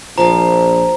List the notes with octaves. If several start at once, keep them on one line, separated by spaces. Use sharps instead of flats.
A#1 F3 F5 A#5